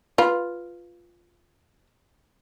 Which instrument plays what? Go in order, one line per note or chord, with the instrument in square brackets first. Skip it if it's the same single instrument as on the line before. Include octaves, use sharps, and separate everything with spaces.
[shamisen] F4 B4